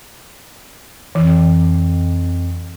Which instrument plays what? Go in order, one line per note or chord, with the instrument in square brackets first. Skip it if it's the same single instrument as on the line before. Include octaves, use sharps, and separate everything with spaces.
[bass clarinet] F2 [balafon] E3